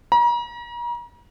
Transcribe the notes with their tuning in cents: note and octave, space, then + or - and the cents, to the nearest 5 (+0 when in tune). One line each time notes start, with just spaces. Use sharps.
A#5 +40